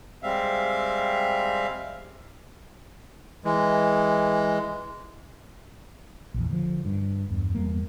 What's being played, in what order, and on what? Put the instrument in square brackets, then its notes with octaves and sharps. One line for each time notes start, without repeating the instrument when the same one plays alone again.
[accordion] G3 G#3 C4 E5 F5
[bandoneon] E3 G#3
[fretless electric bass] A#1 E2
D3 E3 F3
G2
E2 G2
E2 G3 A#3